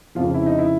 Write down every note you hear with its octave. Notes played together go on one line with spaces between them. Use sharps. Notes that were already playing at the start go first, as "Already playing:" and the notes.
F1 F2 C#3 F3 F4
E4
D#4
E4